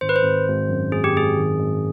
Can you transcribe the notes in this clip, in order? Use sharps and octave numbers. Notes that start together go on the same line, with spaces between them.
G#1 C5
B4
C5
G#1
G#1
F#2
G#1 G#4
G4
G#1 G#4
D#3
G#1